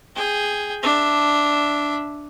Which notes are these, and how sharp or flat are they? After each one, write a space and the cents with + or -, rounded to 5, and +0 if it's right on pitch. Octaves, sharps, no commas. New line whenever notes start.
G#4 +0 G5 +10
D4 +0 E5 +0